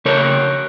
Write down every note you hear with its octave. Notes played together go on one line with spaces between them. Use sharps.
C#3 A#4 C#5